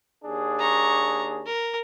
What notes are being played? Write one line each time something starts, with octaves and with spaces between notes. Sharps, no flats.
D#2 D4 G#4
A#5 C#6
A#4